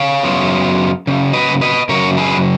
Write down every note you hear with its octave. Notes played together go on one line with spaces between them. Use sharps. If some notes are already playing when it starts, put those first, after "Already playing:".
Already playing: C#5 F5
F#2 C#3 F#3 B3 F4
F#2 C#3
B4 D#5
B4 D#5
F#2 C#3 F#3 A#4 C#5
G#4 B4